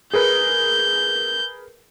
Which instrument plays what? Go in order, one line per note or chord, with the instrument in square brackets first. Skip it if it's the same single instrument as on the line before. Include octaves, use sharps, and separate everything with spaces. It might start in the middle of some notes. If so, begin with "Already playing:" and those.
[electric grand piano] G#4 A#4 B4 [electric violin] G6